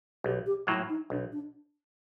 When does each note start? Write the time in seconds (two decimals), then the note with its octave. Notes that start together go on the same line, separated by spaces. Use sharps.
0.24 B1 G4
0.46 G4
0.67 A2 F#3 A#3 E4
0.89 D#4
1.10 B1 D4
1.32 D4